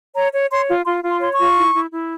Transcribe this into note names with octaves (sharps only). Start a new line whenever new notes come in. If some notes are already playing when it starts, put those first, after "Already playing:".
C#5 A#5
C#5
C#5 C6
F4
F4 C6
F4
C6
C#5 C6
C#6
F4
E4
E4
E4